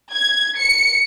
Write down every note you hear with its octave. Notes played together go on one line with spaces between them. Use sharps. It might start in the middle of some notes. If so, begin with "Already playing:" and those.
G#6
C#7